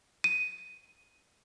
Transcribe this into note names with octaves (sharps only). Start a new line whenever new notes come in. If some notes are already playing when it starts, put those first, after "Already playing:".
D#7